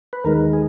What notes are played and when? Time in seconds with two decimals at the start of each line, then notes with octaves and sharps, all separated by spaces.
0.13 B4
0.25 D#2 D#3 G#3 A#4
0.53 G#4